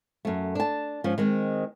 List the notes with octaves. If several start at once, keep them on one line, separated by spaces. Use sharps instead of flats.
F#2 A3
D4 A5
G#2 F3 C#4
D#3 G#3 C4